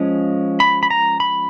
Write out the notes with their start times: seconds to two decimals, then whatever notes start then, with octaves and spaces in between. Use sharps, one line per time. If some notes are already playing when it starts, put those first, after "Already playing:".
Already playing: F3 G#3 C#4
0.60 B5
0.83 B5
0.90 A#5
1.20 B5